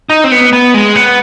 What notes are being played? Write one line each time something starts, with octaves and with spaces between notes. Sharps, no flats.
D#4
C4
B3
B3
G#3
B3